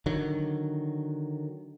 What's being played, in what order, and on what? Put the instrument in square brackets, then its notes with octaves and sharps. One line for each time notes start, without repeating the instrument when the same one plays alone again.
[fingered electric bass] D3 D#3 F#3